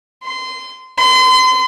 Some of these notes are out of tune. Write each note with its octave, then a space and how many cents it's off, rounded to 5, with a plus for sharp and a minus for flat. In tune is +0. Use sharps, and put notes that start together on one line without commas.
C6 -20
C6 -35